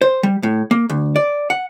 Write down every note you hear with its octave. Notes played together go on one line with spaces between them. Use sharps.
C5
G3
A2
A#3
D2
D5
F#5